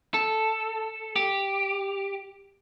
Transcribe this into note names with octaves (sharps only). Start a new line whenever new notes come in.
A4
G4